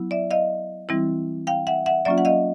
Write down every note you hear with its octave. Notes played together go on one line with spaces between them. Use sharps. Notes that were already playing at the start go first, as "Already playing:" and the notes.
Already playing: F#3 B3 E4
D5 E5
D#5 F5
E3 G3 C4 E4
F5 G5
E5 F#5
E5 F#5
F#3 A#3 C#4 F4 D5 E5
F#5
D#5 F5